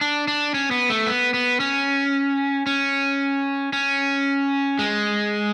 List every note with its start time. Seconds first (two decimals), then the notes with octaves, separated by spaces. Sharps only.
0.01 D4
0.28 D4
0.54 C#4
0.71 B3
0.90 A3
1.07 B3
1.34 B3
1.60 C#4
2.66 C#4
3.73 C#4
4.79 G#3